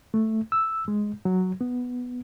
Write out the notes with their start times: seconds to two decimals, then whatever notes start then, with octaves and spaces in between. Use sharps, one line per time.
0.14 A3
0.52 E6
0.88 G#3
1.25 F#3
1.61 B3